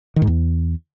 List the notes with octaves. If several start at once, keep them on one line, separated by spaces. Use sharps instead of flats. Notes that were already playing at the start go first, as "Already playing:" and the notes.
D#3
G#2
E2